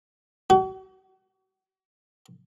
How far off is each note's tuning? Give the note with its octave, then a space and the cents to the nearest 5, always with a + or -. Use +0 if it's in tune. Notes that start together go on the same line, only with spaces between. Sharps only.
F#4 +40